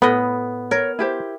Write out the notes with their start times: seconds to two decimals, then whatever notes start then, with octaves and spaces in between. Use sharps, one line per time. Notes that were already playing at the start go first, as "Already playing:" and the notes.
0.02 A2 B3 D#5 B5
0.71 A#4 C#5
0.99 E4 G4 C5